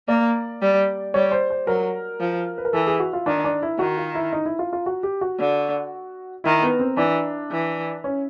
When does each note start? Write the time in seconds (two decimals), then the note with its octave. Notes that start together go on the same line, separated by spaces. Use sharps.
0.08 A#3 D5
0.62 G3
1.14 G3 C#5
1.32 C5
1.50 C5
1.67 F#3 A#4
2.20 F3
2.58 B4
2.65 A#4
2.73 E3 A4
2.87 G#4
2.99 F#4
3.13 F4
3.26 D#3 D4
3.44 D4
3.62 E4
3.79 D#3 F#4
3.97 F4
4.15 E4
4.33 D#4
4.46 E4
4.59 F4
4.73 F4
4.86 F#4
5.03 G4
5.21 F#4
5.39 D3
6.44 D#3 E4
6.63 B3
6.80 C4
6.97 E3 D4
7.51 E3
8.04 C#4